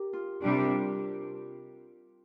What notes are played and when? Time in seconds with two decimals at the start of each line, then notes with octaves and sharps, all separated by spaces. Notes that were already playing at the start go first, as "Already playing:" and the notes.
Already playing: G4 A#4
0.13 F4
0.42 C3 G3 D4 G4
0.56 A#4
0.70 F4